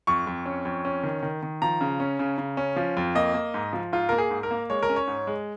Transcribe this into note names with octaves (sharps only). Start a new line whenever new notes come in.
F2 C#6
F2
C#4
F2
C#4
D#3
D#3
D#3
F3 A#5
C#3
C#4
C#3
C#3
C#4
F3
F2
A#3 D#5
A#3
G#2
F3
G#2 F4
A#3 A#4
G#4
G#2
A#4
A#3
G#3 C#5
A#4
C#4
C#5
G#2
G#3